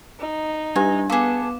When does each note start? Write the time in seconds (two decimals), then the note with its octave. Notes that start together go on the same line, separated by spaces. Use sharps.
0.20 D#4
0.76 G3 D4 G4 G#5
1.10 B3 G#4 A4 F5 D6 E7